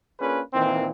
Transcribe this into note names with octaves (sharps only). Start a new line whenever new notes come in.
A#3 C#4 D4 F4 G#4 B4
A#2 D#3 E3 A#3 C4